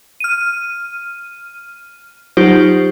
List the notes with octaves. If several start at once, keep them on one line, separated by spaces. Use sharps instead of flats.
F6 D#7
F#3 D#4 F4 G4 C5